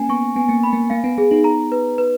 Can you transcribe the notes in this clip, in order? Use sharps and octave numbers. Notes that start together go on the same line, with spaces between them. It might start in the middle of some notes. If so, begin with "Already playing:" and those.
Already playing: A#3 C#4 G#5
B3 C#6
B3 G#5
A#3
B5
A#3
A#3 F5
B3
B3 G#4
B3 D#4
A#5
B4
B4